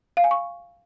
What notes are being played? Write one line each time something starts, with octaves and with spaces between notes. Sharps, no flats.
F5
G#5
C#6